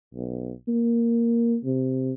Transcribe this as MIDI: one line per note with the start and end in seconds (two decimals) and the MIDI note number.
0.14 0.52 35
0.68 1.57 58
1.65 2.14 48